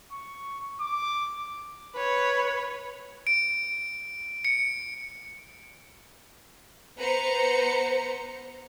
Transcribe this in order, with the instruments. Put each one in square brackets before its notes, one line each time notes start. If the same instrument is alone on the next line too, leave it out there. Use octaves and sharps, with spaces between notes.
[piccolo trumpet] C#6
D6
[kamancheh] B4 C#5
[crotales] D7
C#7
[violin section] B3 B4 C5 A#5 C#7